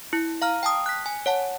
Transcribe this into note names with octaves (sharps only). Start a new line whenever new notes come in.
E4
F5 A#5 F6
G5 A5 D#6
F#6 B6
G#5
C#5 F#5 A5